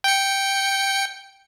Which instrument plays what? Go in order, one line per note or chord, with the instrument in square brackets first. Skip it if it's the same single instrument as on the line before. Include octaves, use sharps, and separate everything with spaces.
[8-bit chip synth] G5 C#7